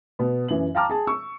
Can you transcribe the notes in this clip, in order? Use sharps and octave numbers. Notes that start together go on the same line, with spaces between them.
B2 B3
F#2 E3 F#7
F5 G5 A5 A#5 D6 F6
G#4 A5
C#6 E6